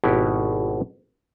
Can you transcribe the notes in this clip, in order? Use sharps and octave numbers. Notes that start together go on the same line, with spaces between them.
G#1 B2 E4 F#4 G4